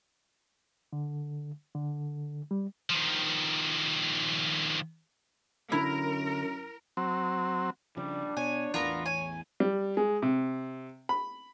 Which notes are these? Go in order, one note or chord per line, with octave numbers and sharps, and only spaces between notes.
D3
D3
G3
D#3 F3
F#2 D3 E4 A#4
F#3 C4
C#3 F3 G3 D4
B2 C#5 G#5
A1 E2 E3 B3 F4 A#4 A#5
C#5 G#5
G3
G#3
C3
B5